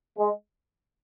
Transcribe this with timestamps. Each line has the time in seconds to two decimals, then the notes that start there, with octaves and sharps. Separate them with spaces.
0.19 G#3